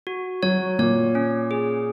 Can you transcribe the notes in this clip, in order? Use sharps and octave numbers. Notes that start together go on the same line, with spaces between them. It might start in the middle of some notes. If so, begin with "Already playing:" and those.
F#4
F#3 C#5
A#2 C#5
C#4
G#4